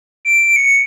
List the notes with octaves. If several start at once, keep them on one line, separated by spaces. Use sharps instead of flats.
D7
C#7